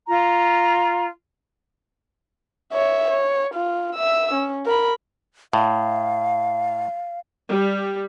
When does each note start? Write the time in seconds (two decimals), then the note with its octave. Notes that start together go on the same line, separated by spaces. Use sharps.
0.07 F4 A#5
2.73 C#5 E5
3.10 C#5
3.54 F4
3.95 E5 E6
4.34 C#4
4.66 A#4 B5
5.53 A2 F5
7.49 G3